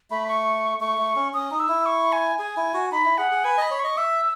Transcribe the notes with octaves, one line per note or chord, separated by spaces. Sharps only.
A3 B5
C#6
A3 C#6
A3
C#4
C#4 D#6
D#4
E6
E4
C#6
G#5
G#4 G#5
E4
F#4
D#4 B5
E4
G#4 F#5
G#4
B4 G#5
D#5 B5
C#5
D#5 C#6
E5 E6